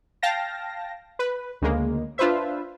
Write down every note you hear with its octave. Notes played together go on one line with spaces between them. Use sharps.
F5 G5 A5 A#6
B4
D2 C#3 G#3 A#3
D4 F4 B4 C5 E5